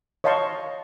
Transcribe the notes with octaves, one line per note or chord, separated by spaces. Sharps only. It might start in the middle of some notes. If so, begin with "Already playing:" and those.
C#5 D#5 F5 A5 C6 C#6